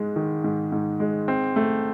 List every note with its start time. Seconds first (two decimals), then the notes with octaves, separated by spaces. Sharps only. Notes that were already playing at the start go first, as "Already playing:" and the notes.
Already playing: G#2 G#3
0.16 D#3
0.44 G#2
0.72 G#2
1.00 G#3
1.28 C4
1.56 A3